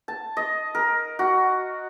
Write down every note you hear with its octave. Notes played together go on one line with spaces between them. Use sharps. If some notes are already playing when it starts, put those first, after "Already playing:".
A5
D#5
A#4
F#4